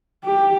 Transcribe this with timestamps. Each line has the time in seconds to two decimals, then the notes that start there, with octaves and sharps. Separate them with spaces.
0.24 G4